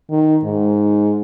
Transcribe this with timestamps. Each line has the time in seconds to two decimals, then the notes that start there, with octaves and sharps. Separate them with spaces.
0.11 D#3
0.44 G#2